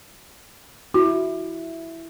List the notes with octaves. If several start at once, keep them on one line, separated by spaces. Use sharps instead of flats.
E4 F#4